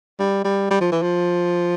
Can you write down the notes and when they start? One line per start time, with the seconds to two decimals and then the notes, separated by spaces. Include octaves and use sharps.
0.19 G3
0.45 G3
0.71 G3
0.81 F3
0.92 E3
1.02 F3